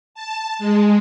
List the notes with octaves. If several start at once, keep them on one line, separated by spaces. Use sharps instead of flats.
A5
G#3